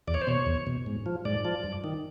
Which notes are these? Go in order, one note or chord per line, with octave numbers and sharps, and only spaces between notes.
E2 D5
C#5
C5
B2 C#5
E2
B2
G#2
F3
G#2 D5
F3
G2
D#3